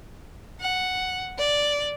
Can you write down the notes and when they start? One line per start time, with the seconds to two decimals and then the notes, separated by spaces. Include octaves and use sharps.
0.61 F#5
1.38 D5